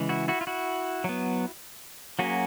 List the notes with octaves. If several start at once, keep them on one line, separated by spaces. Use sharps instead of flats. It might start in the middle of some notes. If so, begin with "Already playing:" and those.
Already playing: C#3 E3 G#3
E4 F#4
E4 F#4
F4
E4 F#4
F#3 B3
F#3 A#3 C#4 F#4 G#4